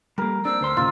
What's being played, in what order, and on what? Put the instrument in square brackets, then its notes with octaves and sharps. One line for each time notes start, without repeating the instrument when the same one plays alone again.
[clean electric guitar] G3 A#3 [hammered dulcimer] A#4
[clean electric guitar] C4 D4 [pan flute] E6
[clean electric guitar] D2 C5 C6
[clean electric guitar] D#2 A#2 C#3 [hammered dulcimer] F4